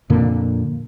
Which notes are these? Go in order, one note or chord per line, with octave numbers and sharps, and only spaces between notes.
F2 A#2 D3 A#3